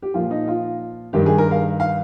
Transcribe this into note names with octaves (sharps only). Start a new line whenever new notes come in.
G4
A#2 F3 F4
D#4
F4
G2 D#3 G4
G#4
A#4
F5
F5